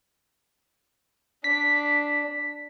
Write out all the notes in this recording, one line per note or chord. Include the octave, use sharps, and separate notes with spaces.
D4 B6